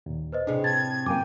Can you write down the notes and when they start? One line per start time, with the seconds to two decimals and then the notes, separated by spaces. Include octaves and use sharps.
0.06 D#2 A#2
0.32 B4 C5 D#5
0.47 A2 C3 D4 G#4
0.64 A5 G#6 A6
1.06 F#2 A#3 G5 G#5 D6